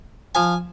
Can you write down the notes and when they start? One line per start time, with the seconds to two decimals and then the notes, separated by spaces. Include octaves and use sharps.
0.35 F3 G#5